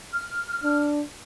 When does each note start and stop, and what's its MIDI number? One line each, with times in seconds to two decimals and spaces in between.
0.13 0.87 89
0.64 1.03 62